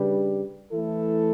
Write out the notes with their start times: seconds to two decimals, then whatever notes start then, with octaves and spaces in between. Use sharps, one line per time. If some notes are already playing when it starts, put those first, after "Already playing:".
Already playing: C#3 G3 D4 G4 B4
0.73 E3 A3 E4 A4